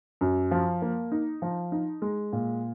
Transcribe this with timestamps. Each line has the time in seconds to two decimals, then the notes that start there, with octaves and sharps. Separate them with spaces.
0.21 F#2
0.51 F3
0.82 A#3
1.12 D#4
1.42 F3
1.72 D#4
2.02 G#3
2.33 A#2